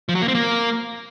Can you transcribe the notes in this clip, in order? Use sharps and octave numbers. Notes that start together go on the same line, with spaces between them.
F3
F#3
A#3
C4
A#3